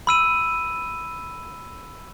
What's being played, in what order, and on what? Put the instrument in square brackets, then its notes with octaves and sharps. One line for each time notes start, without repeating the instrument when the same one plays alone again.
[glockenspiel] B5 E6 D#7